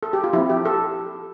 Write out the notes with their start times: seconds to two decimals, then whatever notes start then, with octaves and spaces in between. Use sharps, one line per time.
0.03 A4
0.13 G4
0.24 F4
0.33 F3 C4 E4
0.50 G4
0.65 A4